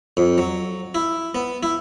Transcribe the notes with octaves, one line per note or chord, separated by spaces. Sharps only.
F2
F#3
E4
B3
E4